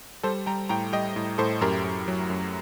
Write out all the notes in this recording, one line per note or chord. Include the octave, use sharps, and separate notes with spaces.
G3 A4 C5
G3 G5 A#5
A2 G5 A#5
G3 D#5 G5
A2
A2 A4 C5
F#2 G4 A#4
F#2
F#3
F#2